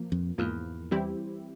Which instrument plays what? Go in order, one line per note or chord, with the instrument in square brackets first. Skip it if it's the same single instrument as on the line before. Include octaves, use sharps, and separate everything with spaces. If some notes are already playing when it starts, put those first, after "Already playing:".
Already playing: [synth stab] A#2 F3 A#3
[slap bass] F2
[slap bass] E2 [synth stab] G#2 F3 A#3
[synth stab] E3 G3 C4 E4 G4